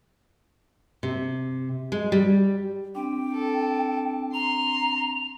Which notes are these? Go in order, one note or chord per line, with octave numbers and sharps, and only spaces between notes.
C3
G#3
G3
C4 D4 G5
A4
A#5 C6 F7